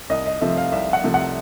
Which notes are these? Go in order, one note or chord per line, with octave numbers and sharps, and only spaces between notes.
C2 D#5
D#5
C3 F3 A3 E5
F5
C2 E5
F#5
C3 F3 A3
F#5